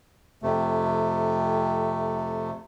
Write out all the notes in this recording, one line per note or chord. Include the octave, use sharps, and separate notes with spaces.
F2 C3 A3